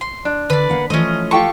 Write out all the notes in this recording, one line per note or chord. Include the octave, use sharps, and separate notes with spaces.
C6
D4
D3 B4 D5
A#3 F5 F#5
E3 F3 A3 C#4 D#5
F4 G4 A4 C#6